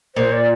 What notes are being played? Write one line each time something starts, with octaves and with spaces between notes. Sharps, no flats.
A#2 C5
D5